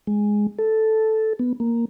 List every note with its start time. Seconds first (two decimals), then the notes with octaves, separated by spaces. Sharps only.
0.07 G#3
0.59 A4
1.39 B3
1.60 A#3